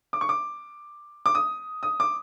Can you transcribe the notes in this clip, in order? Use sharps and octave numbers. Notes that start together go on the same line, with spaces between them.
D6
C#6
D6
D6
D#6
D#6
D6